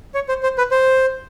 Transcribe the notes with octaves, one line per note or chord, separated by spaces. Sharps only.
C#5
C5
C5
B4
C5